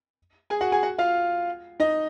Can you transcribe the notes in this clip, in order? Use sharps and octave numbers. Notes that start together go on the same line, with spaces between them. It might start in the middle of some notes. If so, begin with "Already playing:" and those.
G#4 G#5
F#4 F#5
G#4 G#5
F#4 F#5
F4 F5
D#4 D#5